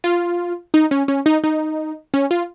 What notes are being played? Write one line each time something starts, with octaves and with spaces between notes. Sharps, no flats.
F4
D#4
C#4
C#4
D#4
D#4
C#4
F4